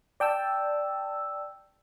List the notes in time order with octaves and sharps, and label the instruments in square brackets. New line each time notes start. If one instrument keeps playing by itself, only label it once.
[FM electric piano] D5 G5 A5 E6